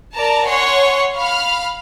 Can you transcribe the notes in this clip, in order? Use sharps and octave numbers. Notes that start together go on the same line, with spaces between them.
A#4 D5 A5 A#5
C#5 F#5 G#5 C6 C#6
F5 B5 F6